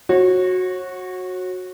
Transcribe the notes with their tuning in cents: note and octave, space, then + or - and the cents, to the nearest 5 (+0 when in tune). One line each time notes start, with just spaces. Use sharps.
F#4 -10 C#5 -35